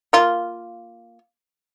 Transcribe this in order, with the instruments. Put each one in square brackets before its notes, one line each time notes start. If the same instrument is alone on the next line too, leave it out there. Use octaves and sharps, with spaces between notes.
[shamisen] A#3 F4